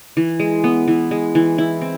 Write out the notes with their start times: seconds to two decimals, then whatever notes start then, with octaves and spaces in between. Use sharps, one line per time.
0.17 E3
0.40 G#3
0.64 B3
0.88 E3
1.11 G#3
1.35 E3
1.58 E4
1.81 C4